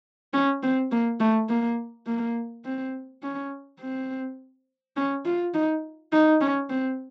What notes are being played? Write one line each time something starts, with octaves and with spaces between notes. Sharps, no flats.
C#4
C4
A#3
A3
A#3
A#3
C4
C#4
C4
C#4
F4
D#4
D#4
C#4
C4